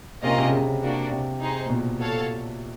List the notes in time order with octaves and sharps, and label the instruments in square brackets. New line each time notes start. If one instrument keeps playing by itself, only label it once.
[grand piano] C3 [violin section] A#3 C#4 F4 A#4 D#5
[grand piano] C3
C#3
C3
[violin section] A#3 D4 F#4
[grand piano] C3
[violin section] D#4 G#4 C5
[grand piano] A#2
B2
[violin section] F#4 A4 C#5 F5 A5